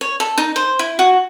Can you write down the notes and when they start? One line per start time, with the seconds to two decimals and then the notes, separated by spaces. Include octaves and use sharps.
0.01 C#5
0.20 A4
0.38 D#4
0.56 C5
0.79 E4
0.99 F#4